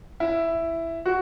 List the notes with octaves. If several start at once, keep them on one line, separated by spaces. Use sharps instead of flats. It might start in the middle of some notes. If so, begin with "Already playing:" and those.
E4
F#4